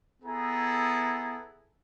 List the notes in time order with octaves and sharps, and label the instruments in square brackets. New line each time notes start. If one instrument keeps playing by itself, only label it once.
[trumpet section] B3 E4 G#4 A4 A#5